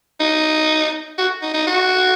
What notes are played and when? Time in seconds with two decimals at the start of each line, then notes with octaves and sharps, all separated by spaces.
0.20 D#4
1.18 F#4
1.42 D#4
1.54 D#4
1.67 F#4